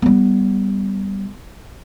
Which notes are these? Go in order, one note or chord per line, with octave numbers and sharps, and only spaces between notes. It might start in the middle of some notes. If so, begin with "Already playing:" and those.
G3 B3